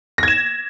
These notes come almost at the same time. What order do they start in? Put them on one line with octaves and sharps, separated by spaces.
A#6 G#6 E7